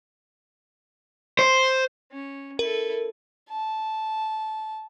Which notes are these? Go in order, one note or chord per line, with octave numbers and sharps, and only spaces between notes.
C5
C#4
E4 A4 A#4
A5